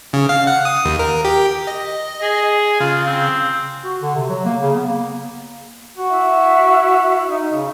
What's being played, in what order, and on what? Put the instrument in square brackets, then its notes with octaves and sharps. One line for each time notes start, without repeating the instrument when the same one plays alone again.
[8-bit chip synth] C#3
F5
F#5
D#6
D#2
A#4
G4
D#5
[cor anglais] G#4
[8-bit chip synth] C#3 [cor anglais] F4
[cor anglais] C4
[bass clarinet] F#4
D3
C3
F#3
A#3
C#3
B3
A#3
[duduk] F#4
[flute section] E4 E5
[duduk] D#4
C#3